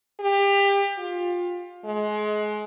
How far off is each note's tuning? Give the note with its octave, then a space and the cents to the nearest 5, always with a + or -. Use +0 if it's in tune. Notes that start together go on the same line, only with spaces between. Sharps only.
G4 +25
F4 +20
G#3 +25